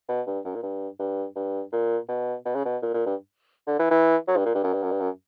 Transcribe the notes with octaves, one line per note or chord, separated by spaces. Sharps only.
B2
G2
F#2
A#2
G2
G2
G2
A#2
B2
B2
C#3
B2
A#2
A#2
G2
D3
E3
E3
F#3
G2
A#2
G2
F#2
G2
F#2
G2
F#2